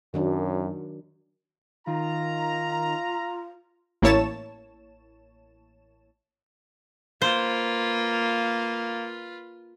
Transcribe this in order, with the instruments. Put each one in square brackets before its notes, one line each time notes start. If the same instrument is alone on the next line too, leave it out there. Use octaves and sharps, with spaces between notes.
[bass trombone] F#2 [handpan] D#3 F#3 D4
[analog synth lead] D#3 [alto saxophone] F4 [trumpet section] A#5
[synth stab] A1 A#3 E4 C#5 A5 E7
[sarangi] A#3 [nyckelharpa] F4 B4 [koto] C5